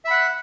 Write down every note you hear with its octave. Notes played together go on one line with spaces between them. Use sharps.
E5 F#5 B5 F#6